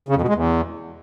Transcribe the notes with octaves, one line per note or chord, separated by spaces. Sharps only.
C#3
F2
B2
G#3
E2